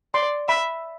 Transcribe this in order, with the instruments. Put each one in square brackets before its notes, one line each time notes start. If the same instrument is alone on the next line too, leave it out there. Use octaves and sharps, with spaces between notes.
[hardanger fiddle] D5 [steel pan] C6
[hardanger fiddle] E5 [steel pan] B5